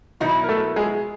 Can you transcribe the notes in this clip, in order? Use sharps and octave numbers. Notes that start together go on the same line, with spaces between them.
B2 D#3 F#3 B3 D#4 E4
A#4
A3 A4
G#3 G#4